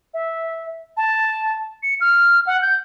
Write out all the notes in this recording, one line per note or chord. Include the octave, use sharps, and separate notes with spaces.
E5
A5
C#7
F6
F#5
G6